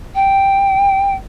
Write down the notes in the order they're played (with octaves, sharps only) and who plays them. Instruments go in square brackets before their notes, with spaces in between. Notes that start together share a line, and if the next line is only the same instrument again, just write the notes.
[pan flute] G5